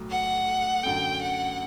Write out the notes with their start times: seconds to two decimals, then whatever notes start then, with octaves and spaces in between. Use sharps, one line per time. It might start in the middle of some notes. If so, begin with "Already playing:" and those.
Already playing: B1 A2 F#3
0.11 F#5
0.83 F#2 D3 A3 G5
1.21 F#5